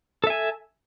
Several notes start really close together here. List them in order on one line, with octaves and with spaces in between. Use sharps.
A4 E5 G#5